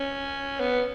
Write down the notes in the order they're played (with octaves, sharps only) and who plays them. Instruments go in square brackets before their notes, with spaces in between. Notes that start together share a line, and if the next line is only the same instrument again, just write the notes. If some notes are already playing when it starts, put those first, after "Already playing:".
Already playing: [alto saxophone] C#4
B3